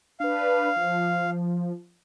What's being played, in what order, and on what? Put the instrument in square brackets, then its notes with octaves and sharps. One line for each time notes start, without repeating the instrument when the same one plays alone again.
[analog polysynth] D4 B4 [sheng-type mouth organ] F5
[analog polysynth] F3